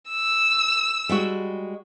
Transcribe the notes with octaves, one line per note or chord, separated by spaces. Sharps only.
E6
G3 G#3 F#4